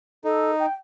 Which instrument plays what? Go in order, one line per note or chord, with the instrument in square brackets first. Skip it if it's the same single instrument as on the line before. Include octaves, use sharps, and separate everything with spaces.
[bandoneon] D#4 [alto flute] A4
[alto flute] G5